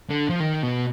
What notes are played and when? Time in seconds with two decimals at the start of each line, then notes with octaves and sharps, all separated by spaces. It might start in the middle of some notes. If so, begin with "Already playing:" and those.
0.09 D3
0.29 F3
0.40 D#3
0.63 B2